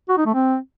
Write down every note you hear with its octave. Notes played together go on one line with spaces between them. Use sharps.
F#4
D#4
A3
C4